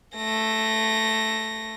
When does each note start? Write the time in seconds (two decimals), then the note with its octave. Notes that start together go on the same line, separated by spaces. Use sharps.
0.15 A3 A#6